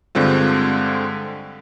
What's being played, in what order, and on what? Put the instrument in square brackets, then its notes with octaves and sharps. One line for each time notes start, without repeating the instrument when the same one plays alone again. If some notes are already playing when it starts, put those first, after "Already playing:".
[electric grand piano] G2 D3 G#3 C4 F4